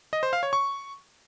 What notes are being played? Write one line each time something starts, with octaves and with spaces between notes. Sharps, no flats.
D#5
C5
F5
C#5
C#6